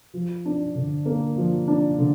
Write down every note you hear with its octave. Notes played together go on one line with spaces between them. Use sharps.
F3
D4
D3
A#3
F3
D4
D3